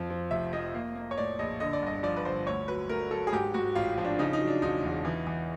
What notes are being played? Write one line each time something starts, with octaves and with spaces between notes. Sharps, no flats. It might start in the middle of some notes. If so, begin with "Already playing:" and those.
Already playing: F2 F3
F3
F1 E5
F3 D#5
A#3
A#3
C#5
A2 D5
A#1 D#5
D3 D#5
D5
G1 D#5
F3 D5
B4
G1 C5
D2 C#5
F#3 B4
A3 A#4
F#3 A4
G#4
G#2 G4
G#2 F#4
A1 F4
F3
D4
C#3 D#4
D#4
F#3
D4
E1 D#4
E2
E3
E3